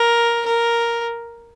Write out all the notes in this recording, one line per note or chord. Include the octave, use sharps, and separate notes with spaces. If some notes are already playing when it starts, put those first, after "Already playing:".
Already playing: A#4
A#4